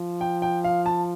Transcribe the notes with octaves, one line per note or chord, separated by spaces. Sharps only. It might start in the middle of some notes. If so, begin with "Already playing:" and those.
Already playing: F3
G5
G5
F5
A5